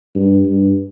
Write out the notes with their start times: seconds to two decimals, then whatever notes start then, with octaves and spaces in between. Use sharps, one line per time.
0.15 G2
0.46 G2